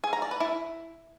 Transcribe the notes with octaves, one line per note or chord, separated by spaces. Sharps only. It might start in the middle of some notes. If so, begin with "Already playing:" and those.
G#4
A#5
D5
B4
E4